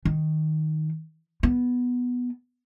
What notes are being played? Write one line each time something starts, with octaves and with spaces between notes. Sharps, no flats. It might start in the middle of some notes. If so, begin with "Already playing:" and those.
D#3
B3